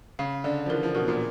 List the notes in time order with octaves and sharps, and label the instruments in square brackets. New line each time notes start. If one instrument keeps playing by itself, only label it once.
[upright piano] C#3 [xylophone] F5
[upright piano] D3 [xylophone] D5
[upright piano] F3
[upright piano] E3 [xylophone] A#4
[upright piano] F3
[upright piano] B2 [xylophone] A#4
[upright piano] A#2